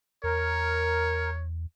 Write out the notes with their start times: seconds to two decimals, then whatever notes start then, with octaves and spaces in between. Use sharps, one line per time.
0.24 E2 A#4 C#5